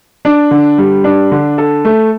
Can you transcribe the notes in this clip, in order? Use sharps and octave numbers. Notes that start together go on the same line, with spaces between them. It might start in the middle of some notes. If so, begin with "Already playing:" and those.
D4
D3
G3
D4
D3
A4
A3